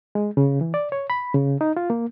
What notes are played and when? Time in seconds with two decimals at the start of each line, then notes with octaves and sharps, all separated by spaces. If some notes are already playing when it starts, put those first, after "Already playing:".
0.15 G#3
0.37 C#3
0.61 E3
0.74 D5
0.92 C#5
1.10 B5
1.34 C#3
1.61 D#4
1.77 F4
1.90 A#3